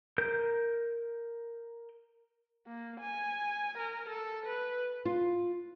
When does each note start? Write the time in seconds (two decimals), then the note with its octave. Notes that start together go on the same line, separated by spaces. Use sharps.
0.18 A#4 G6
2.67 A#3
3.00 G#5
3.78 A#4
4.10 A4
4.46 B4
5.05 F4